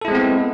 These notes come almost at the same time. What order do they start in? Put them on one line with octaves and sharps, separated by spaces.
A4 E4 G#3 C4 B3